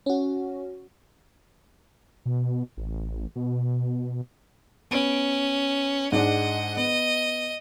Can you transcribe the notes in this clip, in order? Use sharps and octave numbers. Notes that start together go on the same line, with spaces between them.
C#4 F#4
B2
A1
B2
B3 C#4 D7
G#2 G#3 D4 D#5 F#5
B3 D#5